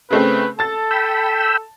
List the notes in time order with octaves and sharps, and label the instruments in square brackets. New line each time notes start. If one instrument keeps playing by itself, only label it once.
[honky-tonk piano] C#3 A3 C4 [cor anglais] B4
[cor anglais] A4 [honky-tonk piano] A5 A6
[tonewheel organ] G5 B5 E6